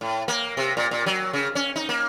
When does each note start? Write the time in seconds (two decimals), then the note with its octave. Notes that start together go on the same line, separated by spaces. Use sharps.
0.01 A2
0.28 A#3
0.57 C3
0.77 A#2
0.91 A#2
1.06 F#3
1.33 C#3
1.55 C#4
1.76 D#4
1.89 A#3